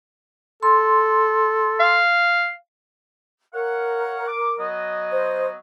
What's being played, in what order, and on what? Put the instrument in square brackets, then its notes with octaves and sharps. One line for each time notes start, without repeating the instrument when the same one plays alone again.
[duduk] A4 [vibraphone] C6
[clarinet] F5
[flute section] A#4 [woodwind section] C#5 F5 F#5
[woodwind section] D6
F#3 B3 D#5
[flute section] C5